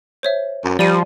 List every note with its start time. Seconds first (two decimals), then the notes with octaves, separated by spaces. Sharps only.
0.23 C5 C#5 E5
0.64 F#2
0.79 F3 G3 D5 D#7